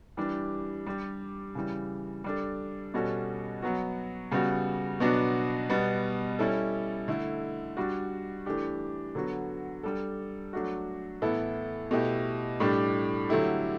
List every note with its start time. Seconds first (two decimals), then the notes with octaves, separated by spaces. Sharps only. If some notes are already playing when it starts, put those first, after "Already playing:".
0.17 E3 G3 D4 G4
0.86 G3 D4 G4
1.55 C#3 E3 G3
2.24 G3 D4 A4
2.94 B2 G3 C#4 F#4 A4
3.62 F#3 B3 F#4
4.31 C#3 G3 B3 F#4
5.00 B2 F#3 B3 D4 F#4
5.70 B2 G3 B3
6.39 G3 C#4 E4 A4
7.08 D3 A3 E4
7.77 G3 D4 F#4
8.46 E3 A3 D4 G4
9.15 D3 F#3 B3 F#4
9.83 G3 D4 A4
10.53 F#3 A3 D4 F#4
11.22 A2 E3 B3 E4 A4
11.91 B2 A3 E4 G4
12.60 A2 G3 D4 G4
13.29 D3 F#3 A3 E4 G4